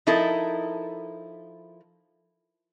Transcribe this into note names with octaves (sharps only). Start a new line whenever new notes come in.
F3 D#4 E4 A4 A#4